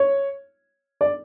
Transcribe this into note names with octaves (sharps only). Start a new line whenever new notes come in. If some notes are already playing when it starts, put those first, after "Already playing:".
Already playing: C#5
D5